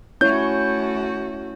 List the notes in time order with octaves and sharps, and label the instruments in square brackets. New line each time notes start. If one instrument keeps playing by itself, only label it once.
[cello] A3 F#4 [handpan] C#4 E4 C#5 [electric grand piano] G6